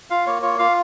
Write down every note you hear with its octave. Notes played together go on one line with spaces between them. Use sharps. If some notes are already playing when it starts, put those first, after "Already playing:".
F4 F5
A#3 C#5
F4 C#5
F4 F5